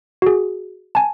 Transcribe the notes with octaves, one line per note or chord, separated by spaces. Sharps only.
F#4 G#4
G#5 A5